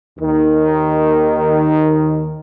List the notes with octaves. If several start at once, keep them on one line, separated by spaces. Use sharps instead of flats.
D#2 D#3